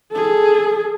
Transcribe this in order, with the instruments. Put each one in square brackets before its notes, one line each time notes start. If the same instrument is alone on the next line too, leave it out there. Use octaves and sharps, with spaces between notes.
[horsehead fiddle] G#4 A4